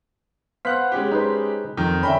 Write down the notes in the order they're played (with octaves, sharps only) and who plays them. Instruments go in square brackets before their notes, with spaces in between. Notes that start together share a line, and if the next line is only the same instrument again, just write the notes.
[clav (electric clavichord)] B3 C5 F5 [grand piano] F#5 F#6 B6
[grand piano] G#3 C#4 G4
[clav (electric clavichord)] D#4 B4 C5
[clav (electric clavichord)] F2 [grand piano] D#3
[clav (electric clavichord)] D3 C#4 [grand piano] E5 G5 B5